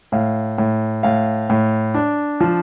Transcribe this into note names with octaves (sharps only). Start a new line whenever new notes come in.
A2 F5
A2
A2 F5
A2
D4
F3